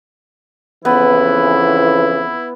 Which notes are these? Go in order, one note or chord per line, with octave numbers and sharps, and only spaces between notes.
F2 C#3 E3 B3 E4